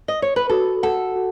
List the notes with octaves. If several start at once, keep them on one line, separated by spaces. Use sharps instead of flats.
D#5
C#5
B4
F#4 A4
A4 F#5
F#4